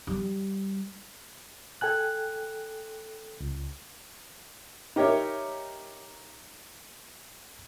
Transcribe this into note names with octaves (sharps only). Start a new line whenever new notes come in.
G3
A4 G5 G#5 F#6
C#2
D#4 G4 A#4 C#5 E5